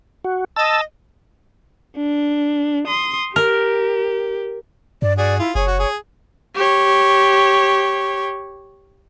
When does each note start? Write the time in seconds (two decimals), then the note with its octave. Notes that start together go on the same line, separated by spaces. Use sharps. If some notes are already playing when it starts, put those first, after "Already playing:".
0.25 F#4
0.56 D#5 A5 E6
1.97 D4
2.87 C6 D#6
3.36 G4 A#4
5.02 G2 D5
5.18 F#4 G#4 D5
5.39 E4 F4
5.55 F#1 G#4 C#5
5.67 F#4
5.80 G#4
6.55 G4 C#5